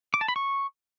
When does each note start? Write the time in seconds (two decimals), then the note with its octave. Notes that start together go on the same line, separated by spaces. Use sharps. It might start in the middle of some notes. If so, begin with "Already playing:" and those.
0.14 D6
0.21 A5
0.28 B5
0.36 C#6